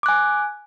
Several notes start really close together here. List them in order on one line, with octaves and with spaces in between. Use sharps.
D6 F#6 G#5